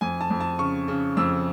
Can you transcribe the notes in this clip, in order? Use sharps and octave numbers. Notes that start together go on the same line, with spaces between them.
F2 G#5
A5
F2
A5
C#3 C#6
C#3
F2 E6